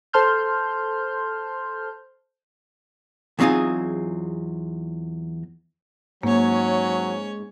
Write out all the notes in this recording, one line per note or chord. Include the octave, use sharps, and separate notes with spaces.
A4 C5 A5 C6 F6 G6
E2 F#3 C4 D#4 F4 G#4
G#2 F#3 A#3 C#4 C#5